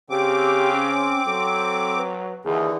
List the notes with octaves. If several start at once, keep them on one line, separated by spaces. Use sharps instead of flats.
C#3 C4 G4 D6
C#4
F#3 A4
B4
D#2 D3 E3 G#4